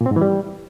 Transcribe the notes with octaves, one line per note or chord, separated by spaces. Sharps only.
A#2
C4
G#2
E3
G3